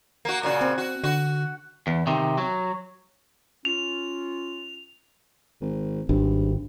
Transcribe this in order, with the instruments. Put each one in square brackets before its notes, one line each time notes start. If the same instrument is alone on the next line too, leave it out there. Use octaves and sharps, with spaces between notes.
[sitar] A#3 F#4
A#2 C#3 F#4
[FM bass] C4
[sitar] F#4
[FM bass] D3 [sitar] F#4
[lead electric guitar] E2
C3 D#3
F#3
[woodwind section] C#4 F4 [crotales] F7
[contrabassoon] G#1
[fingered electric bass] G#1 [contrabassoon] G2